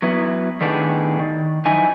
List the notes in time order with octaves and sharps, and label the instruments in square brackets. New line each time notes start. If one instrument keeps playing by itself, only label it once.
[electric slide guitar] F#3 B3 E4
A2 D#3 B3 D4 G4 G#4
D#3
F#2 F3 D#4 E4 G#5